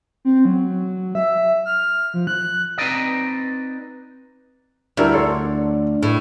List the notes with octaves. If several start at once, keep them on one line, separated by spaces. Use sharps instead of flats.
C4
F#3
E5
F6
F3
F#6
C4 D#4 B4 D5 D#5
D2 G3 E4 A#4
A4 C#5 C6
D4
A2